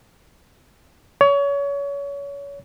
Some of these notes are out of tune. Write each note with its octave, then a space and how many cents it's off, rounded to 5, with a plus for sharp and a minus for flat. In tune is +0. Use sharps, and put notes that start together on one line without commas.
C#5 +30